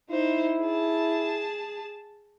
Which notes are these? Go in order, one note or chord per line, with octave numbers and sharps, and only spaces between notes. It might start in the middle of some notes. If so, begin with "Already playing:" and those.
D#4 E4 C5
G#4 A5